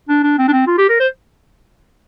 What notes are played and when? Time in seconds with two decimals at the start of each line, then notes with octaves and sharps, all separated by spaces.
0.09 D4
0.23 D4
0.38 C4
0.48 D4
0.52 C4
0.67 F4
0.78 G4
0.89 A#4
1.00 C5